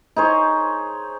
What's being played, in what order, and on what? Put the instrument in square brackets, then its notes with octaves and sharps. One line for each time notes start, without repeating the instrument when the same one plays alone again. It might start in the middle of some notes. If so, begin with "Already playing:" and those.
[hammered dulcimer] D#4 G#4 C5 C#5